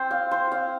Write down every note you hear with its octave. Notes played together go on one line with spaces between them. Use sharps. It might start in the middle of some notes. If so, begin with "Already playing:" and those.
Already playing: C4 C5
F5
C5
F5